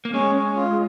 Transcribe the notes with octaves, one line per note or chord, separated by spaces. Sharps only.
A#3
G#3 C#4
C#4
F4